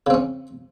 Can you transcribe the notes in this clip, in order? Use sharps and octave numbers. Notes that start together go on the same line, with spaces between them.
C#3 C4 C#4